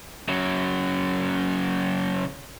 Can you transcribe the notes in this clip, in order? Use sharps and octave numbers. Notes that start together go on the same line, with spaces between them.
C#3 F#3